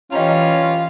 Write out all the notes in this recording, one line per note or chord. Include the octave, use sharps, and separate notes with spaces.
E3 G3 C#4 F4 D#5 A#5